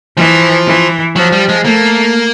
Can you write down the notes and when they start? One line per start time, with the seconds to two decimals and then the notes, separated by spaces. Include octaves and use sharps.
0.17 E3 F3
0.66 E3
1.16 F3 F#3
1.32 G3
1.49 G#3
1.65 A3 A#3